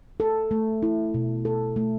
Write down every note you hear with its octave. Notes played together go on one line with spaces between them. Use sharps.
A4
A3
E4
B2
A4
A3